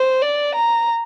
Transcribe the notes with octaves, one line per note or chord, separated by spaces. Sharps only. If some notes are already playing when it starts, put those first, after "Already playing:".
Already playing: C5
D5
A#5